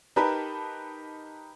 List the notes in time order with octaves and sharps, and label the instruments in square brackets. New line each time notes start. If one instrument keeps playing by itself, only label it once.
[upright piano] D#4 G4 A#4 B4 A5 B5